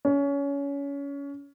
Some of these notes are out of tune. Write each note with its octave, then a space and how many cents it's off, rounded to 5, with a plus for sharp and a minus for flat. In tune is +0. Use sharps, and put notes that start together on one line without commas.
C#4 +25